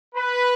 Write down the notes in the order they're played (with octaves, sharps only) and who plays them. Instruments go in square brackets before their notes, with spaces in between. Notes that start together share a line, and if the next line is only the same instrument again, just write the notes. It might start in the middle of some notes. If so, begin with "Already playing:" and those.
[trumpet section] B4